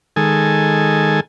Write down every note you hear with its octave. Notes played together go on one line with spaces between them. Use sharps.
D#3 G#3 A4 G#5